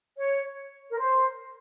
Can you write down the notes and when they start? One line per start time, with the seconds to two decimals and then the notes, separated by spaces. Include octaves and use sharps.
0.16 C#5
0.91 A#4
0.98 C5